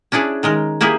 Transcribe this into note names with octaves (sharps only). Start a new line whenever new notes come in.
C#4 D4 E4 G#4 D5
D#3 G#3 A#4
A#3 E4 G4 G#4